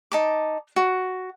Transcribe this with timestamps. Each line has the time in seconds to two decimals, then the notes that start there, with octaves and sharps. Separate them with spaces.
0.12 D#4 A5 D6
0.76 F#4